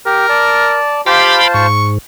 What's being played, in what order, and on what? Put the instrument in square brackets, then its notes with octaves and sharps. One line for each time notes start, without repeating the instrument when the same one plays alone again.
[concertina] G4 [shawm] A#4
[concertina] D5 A5
[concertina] F4 C5 A5 [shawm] G4 [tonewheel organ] F5 G5 B5
[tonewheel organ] G#2 [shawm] C#6